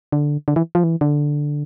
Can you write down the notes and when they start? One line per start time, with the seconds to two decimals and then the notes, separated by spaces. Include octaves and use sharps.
0.12 D3
0.48 D3
0.56 E3
0.75 F3
0.84 E3
1.01 D3